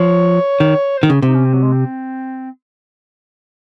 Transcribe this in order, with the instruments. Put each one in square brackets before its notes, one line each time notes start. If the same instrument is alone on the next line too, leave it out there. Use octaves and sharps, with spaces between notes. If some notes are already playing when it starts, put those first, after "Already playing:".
Already playing: [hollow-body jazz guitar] F3 [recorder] C#5
[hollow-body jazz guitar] D#3
[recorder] C5
[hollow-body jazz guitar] D#3
[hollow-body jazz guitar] C#3 [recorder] G#4
[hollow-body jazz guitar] C3 [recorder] D#4
[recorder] C#4
C4
F#3
G#3
C4